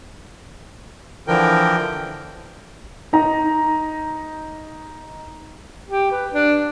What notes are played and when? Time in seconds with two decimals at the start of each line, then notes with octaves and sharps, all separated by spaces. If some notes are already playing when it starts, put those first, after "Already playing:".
1.28 D3 E3 F3 A#4 G5
3.13 D#4 A#5
5.89 G4
6.11 B4
6.33 D4